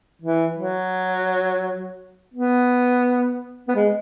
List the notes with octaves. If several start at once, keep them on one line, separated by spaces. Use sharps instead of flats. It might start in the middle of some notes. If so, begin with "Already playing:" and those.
E3
F#3
B3
B3
G#3